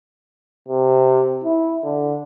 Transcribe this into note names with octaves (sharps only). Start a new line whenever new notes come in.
C3
E4
D3